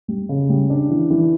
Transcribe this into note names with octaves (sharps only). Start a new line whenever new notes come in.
G3
C#3
G3
D4
E3
E3